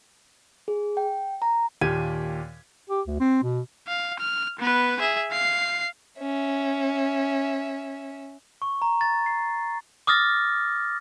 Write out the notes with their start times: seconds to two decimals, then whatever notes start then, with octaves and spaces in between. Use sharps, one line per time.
0.68 G#4
0.97 G5
1.42 A#5
1.81 D#2 A#2 G4 G#6 D#7
2.90 G4
3.07 D2
3.20 C4
3.44 B2
3.88 F5
4.19 F6
4.59 B3 B4
5.00 G#4 E5
5.31 F5 C7
6.19 C#4 E5
8.62 C#6
8.82 A#5
9.01 A6
9.26 C7
10.07 D6 D#6 F6 A6 A#6